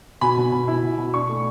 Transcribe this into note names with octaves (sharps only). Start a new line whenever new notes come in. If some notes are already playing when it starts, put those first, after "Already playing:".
B2 G#5 B5
B2
B2
E4
B2
B2
D4 C#6
A3